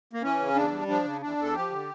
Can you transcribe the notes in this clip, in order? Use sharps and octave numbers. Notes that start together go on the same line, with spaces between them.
A#3
E3 C#4
C#3
E2 D4
G3
F3 D4
C#3
E2 D4
E2 A4
F3 G4
D3